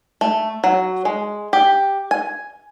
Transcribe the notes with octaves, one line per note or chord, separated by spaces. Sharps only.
A3
F#3
G#3
G4
G#5